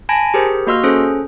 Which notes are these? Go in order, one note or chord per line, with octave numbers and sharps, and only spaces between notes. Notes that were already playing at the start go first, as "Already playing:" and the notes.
G#5 A5 B5 G#6 A#6 D7
G4 G#4 A#4 C5
A#3 F#4 D#5 C6 E6 F6
C#4 G#4 A4 C5